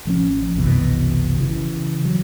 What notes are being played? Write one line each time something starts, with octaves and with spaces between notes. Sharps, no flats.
A1 F3 G#3 C#4
F#1 C2 B2 E3
C#3 E3
E3 F#3